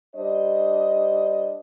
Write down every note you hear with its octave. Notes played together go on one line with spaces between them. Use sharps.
G3 D4 C5 D#5